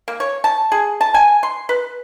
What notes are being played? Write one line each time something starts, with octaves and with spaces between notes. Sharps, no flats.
A#3
C#5
A5
G#4
A5
G#5
C6
B4